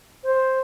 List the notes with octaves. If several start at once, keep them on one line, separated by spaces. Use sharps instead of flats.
C5